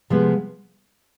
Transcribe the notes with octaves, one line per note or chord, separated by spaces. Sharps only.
C3 F3 G#3 B3